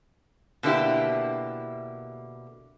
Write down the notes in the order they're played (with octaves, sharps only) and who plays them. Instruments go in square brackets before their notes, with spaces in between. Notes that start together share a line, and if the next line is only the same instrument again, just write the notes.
[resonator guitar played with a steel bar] B2 D3 A#3 E4 G4